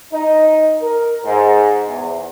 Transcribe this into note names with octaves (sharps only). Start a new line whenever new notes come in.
D#4
A#4
G#2
E2